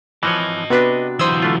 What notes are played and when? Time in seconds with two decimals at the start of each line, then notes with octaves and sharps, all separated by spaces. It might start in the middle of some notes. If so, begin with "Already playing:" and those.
0.23 E3 F3 C#5 D#5 A5
0.70 C3 B3 D4 F#4 B4
1.19 E3 F#3 C5 D#6 E6
1.42 D3 A3 F4